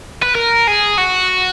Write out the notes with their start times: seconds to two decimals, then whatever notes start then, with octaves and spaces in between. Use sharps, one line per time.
0.22 B4
0.35 A#4
0.67 G#4
0.98 F#4